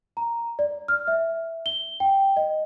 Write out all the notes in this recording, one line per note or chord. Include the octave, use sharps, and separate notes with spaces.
A#5
D5
F6
E5
G7
G5
D#5